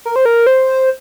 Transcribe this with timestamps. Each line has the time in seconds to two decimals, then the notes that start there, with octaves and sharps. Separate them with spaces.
0.05 A#4
0.16 C5
0.25 A#4
0.47 C5